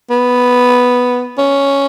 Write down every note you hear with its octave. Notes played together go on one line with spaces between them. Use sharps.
B3
C#4